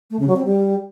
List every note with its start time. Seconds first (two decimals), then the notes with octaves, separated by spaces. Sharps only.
0.11 A3
0.19 C#3
0.28 F#3
0.36 C4
0.45 G3